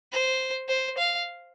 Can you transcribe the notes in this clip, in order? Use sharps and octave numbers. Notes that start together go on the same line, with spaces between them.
C5
C5
F5